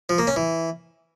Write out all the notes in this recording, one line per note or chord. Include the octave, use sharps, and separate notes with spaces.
F3
A#3
C#4
E3